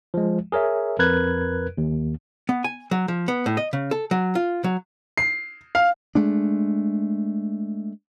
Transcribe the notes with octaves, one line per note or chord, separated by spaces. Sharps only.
F3 G#3
G#4 A#4 C#5 E5
F2 A#4 B4 F#6 G#6
D#2
B3
G#5
F#3
F3
B3
A2
D#5
C#3
A4
F#3
F4
F#3
C7
F5
G#3 A3 D4